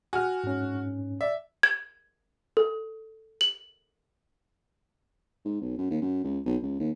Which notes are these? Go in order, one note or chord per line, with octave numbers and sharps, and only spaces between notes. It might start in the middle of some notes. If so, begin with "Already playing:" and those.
F#4 G#5 F6
G#2 C#4
D5 E5
G#6
A4
F#7
G#2
B1
F#2
D#2
F#2
C#2
B1
C#2
D#2